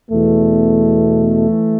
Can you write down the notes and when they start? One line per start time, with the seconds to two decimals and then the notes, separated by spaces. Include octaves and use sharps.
0.11 E2 B2 A3
1.50 E3